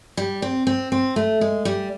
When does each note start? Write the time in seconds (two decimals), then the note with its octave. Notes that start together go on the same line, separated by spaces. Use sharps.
0.17 G3
0.42 C4
0.67 C4
0.92 C4
1.16 A3
1.41 G#3
1.65 G3